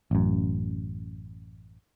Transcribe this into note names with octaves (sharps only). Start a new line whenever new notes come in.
A1 F#2